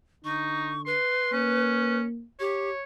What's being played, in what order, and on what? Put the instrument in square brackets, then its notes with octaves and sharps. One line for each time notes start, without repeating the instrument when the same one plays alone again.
[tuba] D3 [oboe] D#4 [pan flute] C#6
[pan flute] B4 [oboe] C6
[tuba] A#3 [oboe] C#4
[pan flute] G4 [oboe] C#5